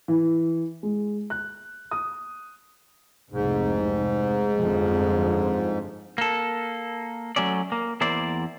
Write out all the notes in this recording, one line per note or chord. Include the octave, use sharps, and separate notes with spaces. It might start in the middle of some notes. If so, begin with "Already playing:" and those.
E3
G#3
F#6
D#6
F1 C2 G#2
G1 F2 F3
A#3 A4
F#3 A3 C#4 D5
A#3
E2 A#3 E4 C5 D5